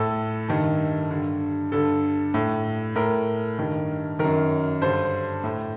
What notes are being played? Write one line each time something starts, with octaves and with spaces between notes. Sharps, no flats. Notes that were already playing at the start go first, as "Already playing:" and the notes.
Already playing: A2 A4
G2 D#3
G2 D3
G2 D3 A4
A2
A2 A#4
G2 D#3
F#2 D#3 A#4
G2 D3 C5
A2